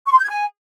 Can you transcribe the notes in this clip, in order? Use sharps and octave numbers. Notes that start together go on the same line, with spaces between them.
C#6
C6
G6
G#6
G#5